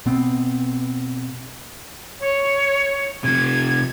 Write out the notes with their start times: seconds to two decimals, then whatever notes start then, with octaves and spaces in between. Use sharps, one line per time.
0.06 B2 B3 C4
2.20 C#5
3.24 C3 F3 G#6